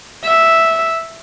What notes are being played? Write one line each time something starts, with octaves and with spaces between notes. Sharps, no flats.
E5